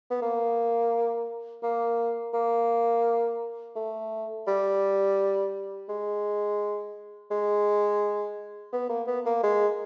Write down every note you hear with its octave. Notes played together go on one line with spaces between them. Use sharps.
B3
A#3
A#3
A#3
A3
G3
G#3
G#3
B3
A#3
B3
A#3
G#3